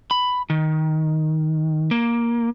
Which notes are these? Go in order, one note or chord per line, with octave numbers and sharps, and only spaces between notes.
B5
D#3
A#3